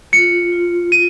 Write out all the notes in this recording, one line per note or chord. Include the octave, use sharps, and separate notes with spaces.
F4 C#7
F4
F4 D#7